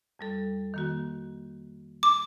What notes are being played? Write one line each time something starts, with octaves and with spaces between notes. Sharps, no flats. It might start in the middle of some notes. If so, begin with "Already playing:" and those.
F2 G3 A4
D#3 A#3 F#4
D6